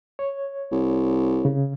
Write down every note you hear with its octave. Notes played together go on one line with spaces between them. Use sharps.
C#5
C2
C#3